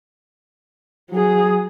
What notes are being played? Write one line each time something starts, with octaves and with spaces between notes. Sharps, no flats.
F#3 G#4